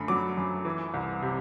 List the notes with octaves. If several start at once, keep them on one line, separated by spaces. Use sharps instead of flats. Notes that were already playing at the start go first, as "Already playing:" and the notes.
Already playing: F#2 D3 A3 B5
F#3 D6
F#2
E3
C2
C3